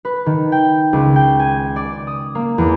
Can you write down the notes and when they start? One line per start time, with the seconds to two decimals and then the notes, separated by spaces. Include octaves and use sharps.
0.05 B4
0.26 D#3
0.52 G5
0.93 C#2
1.16 G5
1.39 G#5
1.76 D5
2.07 D#6
2.35 A#3
2.58 E2